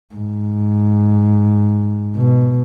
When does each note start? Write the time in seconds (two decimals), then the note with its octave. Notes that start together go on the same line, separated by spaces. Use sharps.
0.15 G#2
2.16 B2